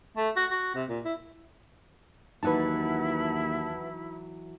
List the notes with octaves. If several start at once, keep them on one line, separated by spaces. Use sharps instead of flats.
A3
F#4
F#4
C3
A#2
E4
D#2 E3 F#3 D#4 E4 B4 F#5 A5